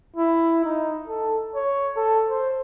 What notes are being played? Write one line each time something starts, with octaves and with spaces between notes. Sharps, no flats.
E4
D#4
A4
C#5
A4
C5